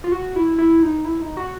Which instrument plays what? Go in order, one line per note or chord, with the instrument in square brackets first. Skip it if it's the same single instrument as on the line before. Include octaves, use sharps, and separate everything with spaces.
[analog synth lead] F4
F#4
E4
E4
D#4
E4
D#4
F#4